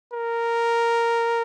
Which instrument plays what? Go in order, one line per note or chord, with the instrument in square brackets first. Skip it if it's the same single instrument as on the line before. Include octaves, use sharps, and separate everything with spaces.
[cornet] A#4